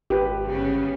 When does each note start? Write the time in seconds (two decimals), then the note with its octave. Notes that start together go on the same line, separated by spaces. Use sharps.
0.10 G#1 G4 B4
0.47 G1 C#3 B3